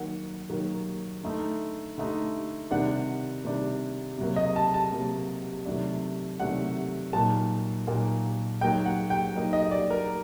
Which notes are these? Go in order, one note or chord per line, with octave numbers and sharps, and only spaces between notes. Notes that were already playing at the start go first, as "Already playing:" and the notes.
Already playing: D#3 F#3 A#3 F#5
D#3 F#3 A#3
D3 A3 D#4
D3 A3 D#4
C3 D#3 G3 D4 F#5
C3 D#3 G3 D4
C3 F#3 A#3
D#5
A5
A5
C3 F#3 A#3
C3 D#3 F#3 A3 D4
C3 D#3 F#3 A3 D4 F#5
A#2 F#3 A#3 D#4 A5
A#2 F#3 A#3 D#4
F#3 A#3 D#4 G5
F#5
G5
F#3 A#3 D#4
D#5
D5
A#4